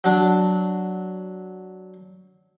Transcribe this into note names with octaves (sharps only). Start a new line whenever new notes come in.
F#3 D4